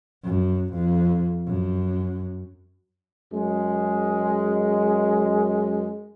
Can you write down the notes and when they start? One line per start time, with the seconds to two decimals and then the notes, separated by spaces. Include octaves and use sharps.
0.23 F#2
0.74 F2
1.46 F#2
3.33 F#2 G#3